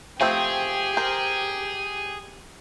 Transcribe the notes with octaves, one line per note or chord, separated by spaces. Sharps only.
F3 A3 C4 G4 G#4
A#4 C5